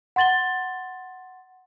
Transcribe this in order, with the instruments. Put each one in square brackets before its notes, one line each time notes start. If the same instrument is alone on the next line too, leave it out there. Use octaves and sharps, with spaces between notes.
[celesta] F#5 C6 A6 F#7 G7